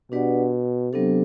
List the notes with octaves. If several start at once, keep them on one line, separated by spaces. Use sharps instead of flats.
B2 D4 G4 B4 D5 F#5
C3 F#3 B3 D4 A4